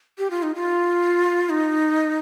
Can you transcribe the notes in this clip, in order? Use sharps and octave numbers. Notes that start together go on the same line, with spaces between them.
G4
F4
D#4
F4
D#4